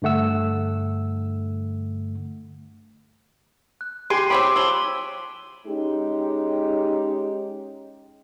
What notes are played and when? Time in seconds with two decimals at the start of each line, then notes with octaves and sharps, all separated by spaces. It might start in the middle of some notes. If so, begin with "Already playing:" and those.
0.02 G2 D3 A3 F#5 E6
3.81 F#6
4.10 G4 G#4 C6 D7 D#7
4.30 C4 C#5 G5 B5 C6 D6
4.56 F3 C#5 E6 F#7 G7
5.67 G#3 C#4 D#4 G4